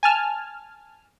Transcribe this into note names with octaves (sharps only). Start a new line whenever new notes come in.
G#5 A5 F6